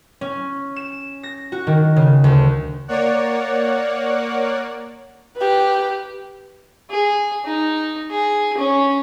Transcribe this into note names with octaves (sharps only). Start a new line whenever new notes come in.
C#4
E7
A#6
F#4
D#3
C#3
D2
A#3 C#5 D5 F#5
G4 B4
G#4
D#4
G#4
C#4